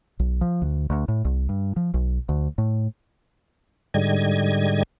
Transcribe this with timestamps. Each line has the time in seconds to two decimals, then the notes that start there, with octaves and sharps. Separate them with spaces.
0.19 B1
0.41 F3
0.62 D2
0.90 D2
1.08 A2
1.25 C2
1.49 G2
1.76 F3
1.94 B1
2.29 D2
2.58 A2
3.94 G#2 D3 G3 D#5 G#6